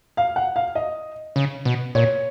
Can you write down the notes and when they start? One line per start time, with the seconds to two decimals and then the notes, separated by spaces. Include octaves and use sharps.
0.17 F5
0.36 F#5
0.56 F5
0.75 D#5
1.36 C#3
1.65 B2
1.95 A#2 C#5